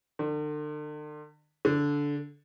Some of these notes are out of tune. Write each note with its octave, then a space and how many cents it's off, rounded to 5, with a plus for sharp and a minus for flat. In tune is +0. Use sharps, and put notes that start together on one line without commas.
D3 +40
D3 -15